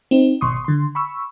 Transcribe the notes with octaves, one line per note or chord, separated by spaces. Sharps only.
C4 D#4
G#1 B2 C6 C#6 D#6
D3 C6
B5 C#6 E6